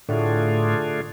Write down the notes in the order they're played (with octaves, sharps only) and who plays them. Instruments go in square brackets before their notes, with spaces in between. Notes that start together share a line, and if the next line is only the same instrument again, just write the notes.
[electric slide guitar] A2 [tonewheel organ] D3 A3 D4 F4 G#4